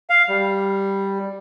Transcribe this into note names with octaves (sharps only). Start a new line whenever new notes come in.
F5
G3